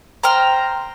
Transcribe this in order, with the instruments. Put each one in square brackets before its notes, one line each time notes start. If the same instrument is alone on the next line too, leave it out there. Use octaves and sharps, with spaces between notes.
[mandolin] C5 G5 F6 [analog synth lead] A#5